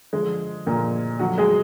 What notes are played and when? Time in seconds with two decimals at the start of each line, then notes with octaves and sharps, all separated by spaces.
0.13 D3 F3 G#3
0.66 A#2 D3 F3 A#3
1.19 D3 F3 F#3 F#4
1.38 G#3 G#4